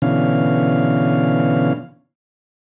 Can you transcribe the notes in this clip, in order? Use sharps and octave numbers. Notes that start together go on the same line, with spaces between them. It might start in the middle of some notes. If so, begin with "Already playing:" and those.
B2 D3 E3 C#4 F5